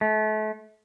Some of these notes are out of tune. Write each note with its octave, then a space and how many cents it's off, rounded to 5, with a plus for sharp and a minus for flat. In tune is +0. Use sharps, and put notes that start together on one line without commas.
A3 -35